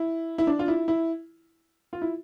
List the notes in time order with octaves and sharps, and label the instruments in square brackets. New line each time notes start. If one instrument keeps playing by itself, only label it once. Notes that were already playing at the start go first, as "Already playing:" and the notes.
Already playing: [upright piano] E4
E4
D4
F4
E4
E4
F4
E4